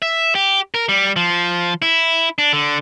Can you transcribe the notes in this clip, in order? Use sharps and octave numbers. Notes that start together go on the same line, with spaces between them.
E5
G4
A#4
G3
F3
E4
D4
D3